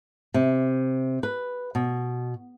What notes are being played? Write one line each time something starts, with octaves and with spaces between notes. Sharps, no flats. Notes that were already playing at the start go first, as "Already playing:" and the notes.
C3
B4
B2